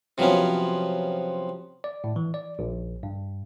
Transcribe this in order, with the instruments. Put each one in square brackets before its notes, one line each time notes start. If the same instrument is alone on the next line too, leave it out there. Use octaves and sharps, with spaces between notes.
[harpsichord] C3 F3 F#3 B3 C#4
[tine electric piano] D5
A2
E3
D5
A#1
G2